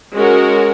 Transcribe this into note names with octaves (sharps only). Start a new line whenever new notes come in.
G#3 C#4 F#4 A#4